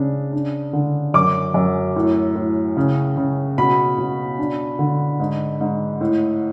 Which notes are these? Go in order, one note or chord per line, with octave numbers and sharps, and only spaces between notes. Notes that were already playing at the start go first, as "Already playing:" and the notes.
Already playing: C#3 D4
D4
D3
F#2 D6
F#2
A2
A2
C#3
C#3
B2 B5
B2
D4
D3
G#2
G#2
A2